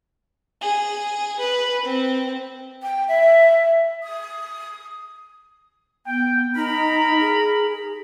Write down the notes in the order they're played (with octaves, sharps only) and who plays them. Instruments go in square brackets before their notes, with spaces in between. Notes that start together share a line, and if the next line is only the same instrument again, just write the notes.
[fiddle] G#4
B4
C4
[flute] G5
E5
D#6
[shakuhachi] B3 [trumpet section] G5
[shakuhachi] D#4 [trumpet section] A#4 A#5 B5
[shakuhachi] G#4